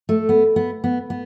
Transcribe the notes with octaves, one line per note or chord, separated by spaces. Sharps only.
A3
B3
B3
B3
B3